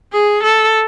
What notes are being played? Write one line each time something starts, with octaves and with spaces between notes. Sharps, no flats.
G#4
A4